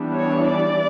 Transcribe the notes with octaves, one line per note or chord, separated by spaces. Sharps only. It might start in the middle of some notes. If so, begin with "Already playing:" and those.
Already playing: E3 G3 B3 D4
C#5
D5